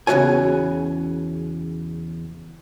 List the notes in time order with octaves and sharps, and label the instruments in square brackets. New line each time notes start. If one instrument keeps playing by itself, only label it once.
[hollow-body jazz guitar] E2 C#3 C4 F#4 C#5 G#5